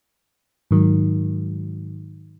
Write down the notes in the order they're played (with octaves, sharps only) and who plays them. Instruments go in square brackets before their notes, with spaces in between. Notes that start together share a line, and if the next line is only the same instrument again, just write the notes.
[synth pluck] G#2 D#3 F#3